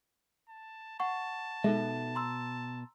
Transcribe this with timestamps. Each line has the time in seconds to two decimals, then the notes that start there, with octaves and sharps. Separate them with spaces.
0.49 A5
1.00 F#5 A5 C#6
1.64 B2 G#3 D#4 A4 E5
2.15 A#5 C6 E6